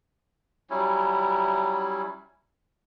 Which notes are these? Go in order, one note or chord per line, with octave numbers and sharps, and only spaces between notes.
F#3 G3 C#4 E4